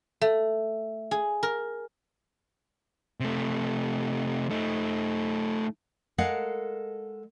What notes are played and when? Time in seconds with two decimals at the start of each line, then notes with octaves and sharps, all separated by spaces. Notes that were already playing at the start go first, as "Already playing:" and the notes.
0.21 A3
1.11 G#4
1.43 A#4
3.20 C3 A3
4.51 A3 D#4
6.18 G#3 A4 A#4 F5 F#5